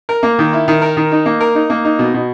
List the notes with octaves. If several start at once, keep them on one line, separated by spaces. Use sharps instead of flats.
A#4
A#3
D#3
E4
D#3
A#4
D#3
D#4
A#3
A#4
D#4
A#3
D#4
B2
B2